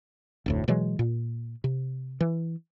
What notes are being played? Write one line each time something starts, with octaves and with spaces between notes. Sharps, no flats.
F1 D2 A2
B2 E3 F#3 G#3
A#2
C3
E3